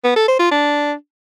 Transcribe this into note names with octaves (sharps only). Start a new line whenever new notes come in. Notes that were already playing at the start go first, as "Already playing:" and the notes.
B3
A4
C5
F4
D4